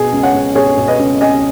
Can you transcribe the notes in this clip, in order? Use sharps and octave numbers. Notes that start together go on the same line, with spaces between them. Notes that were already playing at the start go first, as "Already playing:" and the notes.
Already playing: B2 G#4
C#2
C#5 F#5
C#2
B2 G#4 C#5
B2
B4 D#5
C#2
C#2 D#5 G#5